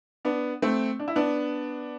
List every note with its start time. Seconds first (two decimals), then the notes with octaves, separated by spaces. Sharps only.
0.25 B3 D4
0.62 A3 C4
0.99 D4
1.08 E4
1.16 B3 D4